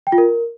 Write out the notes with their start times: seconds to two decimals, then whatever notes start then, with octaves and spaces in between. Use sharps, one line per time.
0.07 G5
0.12 F4
0.18 A#4